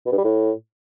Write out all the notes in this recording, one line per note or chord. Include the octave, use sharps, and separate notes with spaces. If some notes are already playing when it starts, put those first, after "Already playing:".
B2
G2
G3
A2